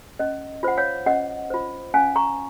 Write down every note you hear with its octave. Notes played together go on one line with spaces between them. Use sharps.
C#4 D#5
F4 C5 F#5
C#5 F5
C#4 D#5 F#5
F4 C5
C#4 F5 G#5
A#5 C#6